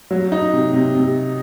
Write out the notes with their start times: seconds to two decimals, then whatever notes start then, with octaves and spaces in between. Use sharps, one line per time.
0.11 F#3
0.32 D#4
0.53 C3
0.73 C3
0.95 C3